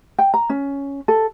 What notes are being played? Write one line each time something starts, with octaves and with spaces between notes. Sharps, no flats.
G5
A#5
C#4
A4